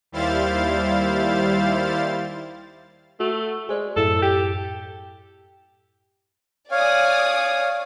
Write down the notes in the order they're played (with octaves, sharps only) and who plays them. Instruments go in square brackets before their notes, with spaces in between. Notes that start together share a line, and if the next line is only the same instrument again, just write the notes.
[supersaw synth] D#2 G3 E4 C5 F5 A6
[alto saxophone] A3 [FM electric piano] F#4
[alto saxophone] G#3 [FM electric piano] G#4 C5 D5
[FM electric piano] F#2 A2 E4 [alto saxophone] A4
[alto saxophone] G4
[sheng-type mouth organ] C#5 F5 [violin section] D5 G#5 D#6